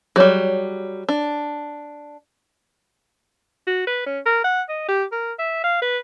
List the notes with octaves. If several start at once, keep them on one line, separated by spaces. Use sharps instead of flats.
F#3 G3 G#4 C#5
D4
F#4
B4
C#4
A#4
F#5
D#5
G4
A#4
E5
F5
B4